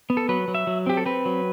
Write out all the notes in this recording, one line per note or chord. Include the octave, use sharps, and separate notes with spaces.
B3
A4
F#3 B4
F#3
E5
F#3
C4 G4
A4
C4 B4
F#3